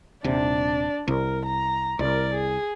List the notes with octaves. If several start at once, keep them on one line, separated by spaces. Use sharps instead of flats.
D#1 C3 D4 D5
C2 A#4
A#5
C2 A#4 D5
G#4